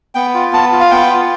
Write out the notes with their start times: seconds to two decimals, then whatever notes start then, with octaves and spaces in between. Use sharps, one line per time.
0.15 B3 G5
0.34 F4
0.53 B3 A5
0.72 F4
0.80 F5
0.91 B3 G5
1.10 F4